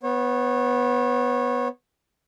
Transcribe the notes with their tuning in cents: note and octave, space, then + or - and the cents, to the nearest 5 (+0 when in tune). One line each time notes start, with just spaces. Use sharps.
B3 +0 C#5 -30